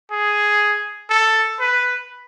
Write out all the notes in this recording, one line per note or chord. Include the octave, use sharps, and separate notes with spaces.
G#4
A4
B4